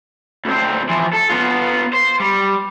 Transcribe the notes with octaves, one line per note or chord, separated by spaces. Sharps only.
D2 C4
E3 F3
A4
B3 F4
C5
G3